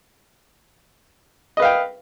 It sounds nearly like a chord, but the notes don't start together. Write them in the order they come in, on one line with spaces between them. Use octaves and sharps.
D#5 B4 F5 G5